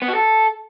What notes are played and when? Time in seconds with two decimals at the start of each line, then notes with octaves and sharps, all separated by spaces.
0.02 B3
0.08 F#4
0.15 A4